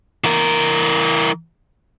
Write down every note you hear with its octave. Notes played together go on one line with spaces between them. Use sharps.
E3 A#4